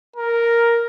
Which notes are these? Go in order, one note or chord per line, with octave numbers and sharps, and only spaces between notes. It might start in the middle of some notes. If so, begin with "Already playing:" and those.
A#4